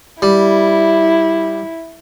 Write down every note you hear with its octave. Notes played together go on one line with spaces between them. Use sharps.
G3 E4